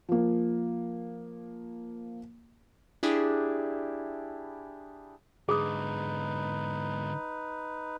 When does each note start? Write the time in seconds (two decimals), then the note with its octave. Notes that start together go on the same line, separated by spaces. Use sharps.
0.09 F3 A#3
3.03 D4 E4 G4 G#4
5.49 G#2 D3 D#4 G#4 B4 D#6